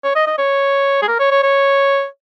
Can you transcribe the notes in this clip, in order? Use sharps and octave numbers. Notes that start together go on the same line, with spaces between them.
C#5
D#5
D#5
C#5
G#4
A#4
C#5
C#5
C#5